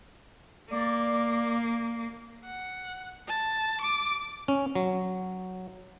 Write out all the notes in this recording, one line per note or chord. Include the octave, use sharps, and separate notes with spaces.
A#3 D5
F#5
A5
D6
C#4
F#3